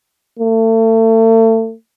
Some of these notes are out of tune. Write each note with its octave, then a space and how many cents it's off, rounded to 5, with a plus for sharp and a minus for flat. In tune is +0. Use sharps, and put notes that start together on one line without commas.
A3 +35